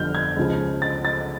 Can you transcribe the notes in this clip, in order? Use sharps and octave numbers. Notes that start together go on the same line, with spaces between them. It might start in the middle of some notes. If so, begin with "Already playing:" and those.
Already playing: G1 F2 D3 F3 F6 G6
G#6
C#2 C#3 F3
A6
A6